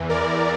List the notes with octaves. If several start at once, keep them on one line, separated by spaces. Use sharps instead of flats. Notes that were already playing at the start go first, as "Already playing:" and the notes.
Already playing: E2 E3
A#4 D5